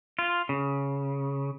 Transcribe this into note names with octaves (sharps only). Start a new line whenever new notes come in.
F4
C#3